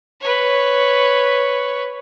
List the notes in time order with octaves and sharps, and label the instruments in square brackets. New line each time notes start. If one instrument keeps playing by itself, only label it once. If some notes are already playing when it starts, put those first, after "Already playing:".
[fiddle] B4 C#5